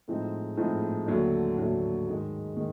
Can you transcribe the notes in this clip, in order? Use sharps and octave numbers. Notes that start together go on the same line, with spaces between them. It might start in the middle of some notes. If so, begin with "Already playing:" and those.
A2 F3 G#3 C4 D#4
A2 F3 G#3 C4 D#4
D#2 D3 F#3 A3
D#2 D3 F#3 A3
G#2 D#3 G#3
D#3 G#3